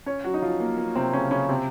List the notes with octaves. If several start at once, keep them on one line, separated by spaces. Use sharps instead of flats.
C#4 C#5
F#3 F#4
D#4
F3 F4
A#3
A#3
C3 C4
C#3 C#4
C#3 C#4
C3 C4